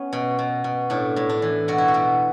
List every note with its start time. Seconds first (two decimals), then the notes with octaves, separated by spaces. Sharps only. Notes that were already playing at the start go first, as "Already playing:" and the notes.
Already playing: B3 C#4
0.13 B2
0.39 B2
0.64 B2
0.90 A2 D4
1.16 A2
1.29 D4
1.42 E3
1.68 B2 F#4
1.78 E4
1.88 F#4
1.94 B2